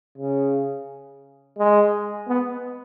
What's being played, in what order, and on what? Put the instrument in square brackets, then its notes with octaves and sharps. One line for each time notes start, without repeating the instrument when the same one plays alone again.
[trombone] C#3
G#3
B3